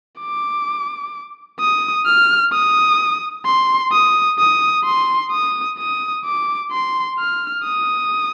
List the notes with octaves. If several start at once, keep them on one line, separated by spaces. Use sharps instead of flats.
D6
D#6
F6
D#6
C6
D#6
D#6
C6
D#6
D#6
D6
C6
F6
D#6